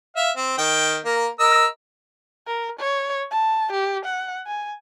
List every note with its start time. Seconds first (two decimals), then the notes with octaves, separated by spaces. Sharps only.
0.16 E5 F5
0.36 C4
0.58 D#3 G5
1.05 A#3 A#4
1.39 A#4 D#5 E6
2.47 A#4
2.79 C#5
3.31 A5
3.72 G4
4.05 F#5
4.47 G#5